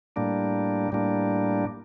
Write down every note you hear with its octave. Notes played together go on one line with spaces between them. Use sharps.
A2 G3 A#3 D4
A2 G3 A#3 D4